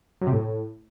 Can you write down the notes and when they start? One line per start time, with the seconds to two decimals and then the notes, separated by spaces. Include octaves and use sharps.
0.21 F#2
0.27 C3
0.32 A2